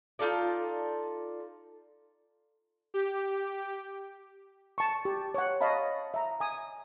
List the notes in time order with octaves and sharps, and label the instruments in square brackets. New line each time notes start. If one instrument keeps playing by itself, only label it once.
[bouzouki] D#4 F4 A4 D5
[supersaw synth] G4
[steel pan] A5 C#6
G4
C#5 F#5
C#5 D#5 F5 A5 B5
E5 A#5
G#5 D#6